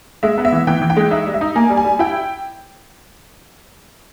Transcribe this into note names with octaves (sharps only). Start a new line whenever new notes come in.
G#3 E5
B3
E5
E3
E3 G5
E3
G5
G#3
D#4 E5
G3
E5
D#4
A#3 G#5
G3
G#5
G3
E4 G5